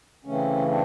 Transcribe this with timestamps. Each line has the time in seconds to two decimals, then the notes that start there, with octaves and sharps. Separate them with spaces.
0.25 C#3 E3 A3 C4 C#4
0.68 C4 D4